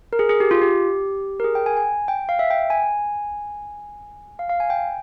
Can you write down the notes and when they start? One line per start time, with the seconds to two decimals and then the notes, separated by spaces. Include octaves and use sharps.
0.13 A#4
0.19 G#4
0.29 G#4
0.40 G4
0.51 F4
0.61 G4
1.40 A#4
1.44 G#4
1.55 G5
1.66 G#5
1.77 G#5
2.08 G5
2.29 F5
2.39 E5
2.50 G5
2.70 G#5
4.39 F5
4.50 F5
4.60 G#5
4.70 G5